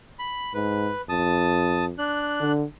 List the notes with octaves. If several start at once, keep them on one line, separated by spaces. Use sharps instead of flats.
B5
G#2 B4
F2 A5 D#6
D4 F#6
D3